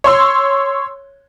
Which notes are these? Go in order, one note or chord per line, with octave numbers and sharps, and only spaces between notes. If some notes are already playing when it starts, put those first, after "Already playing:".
C#5 C6 E6